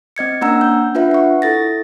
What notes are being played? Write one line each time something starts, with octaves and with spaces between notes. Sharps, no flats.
C4 D#5 G#6 C#7
A#3 C#4 D4 F#5 A#5 E6
G6
D4 F4 B4 E5 F#5
F#5 C#6
E4 A4 A6 A#6